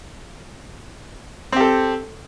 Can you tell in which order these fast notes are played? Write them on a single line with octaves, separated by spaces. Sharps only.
C4 G4 A4